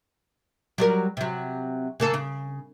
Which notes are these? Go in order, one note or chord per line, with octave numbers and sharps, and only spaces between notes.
F#3 G3 A#4
C3 F#3
C#3 A#3 A4
C#3